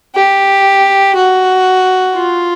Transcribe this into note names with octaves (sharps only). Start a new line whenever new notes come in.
G4
F#4
F4